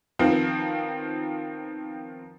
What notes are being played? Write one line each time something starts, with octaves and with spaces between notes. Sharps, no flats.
D#3 F3 B3 C4